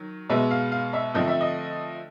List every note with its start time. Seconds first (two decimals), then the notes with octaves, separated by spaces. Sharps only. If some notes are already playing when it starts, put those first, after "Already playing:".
Already playing: D#3 F#3
0.29 B2 G#3 B3 E5
0.51 F5
0.72 F5
0.93 E5
1.14 D3 F3 A3 C4 D#5
1.27 E5
1.41 D#5